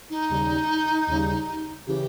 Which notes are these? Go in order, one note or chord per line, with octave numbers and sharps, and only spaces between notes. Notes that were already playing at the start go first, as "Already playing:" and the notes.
D#4
D#2 C#3 G3
D#2 C#3 G3
C#3 E3 G4